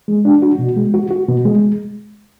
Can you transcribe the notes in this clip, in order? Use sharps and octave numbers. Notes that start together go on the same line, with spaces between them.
G#3
D4
F#4
B2
G#3
F#4
F#4
B2
G#3